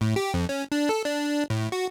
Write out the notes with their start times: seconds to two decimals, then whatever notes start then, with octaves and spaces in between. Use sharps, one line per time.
0.01 A2
0.16 G4
0.34 F2
0.49 C#4
0.72 D4
0.89 A4
1.05 D4
1.50 A2
1.72 F#4